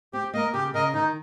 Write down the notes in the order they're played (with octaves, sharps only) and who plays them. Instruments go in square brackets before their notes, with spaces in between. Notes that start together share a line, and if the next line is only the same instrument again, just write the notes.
[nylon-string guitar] C4 [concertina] G4
[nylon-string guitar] A#3 [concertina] A#4 D#5
[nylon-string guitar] C#3 [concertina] G4
[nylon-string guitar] C#3 [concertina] A#4 D#5
[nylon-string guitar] D#3 [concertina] D#4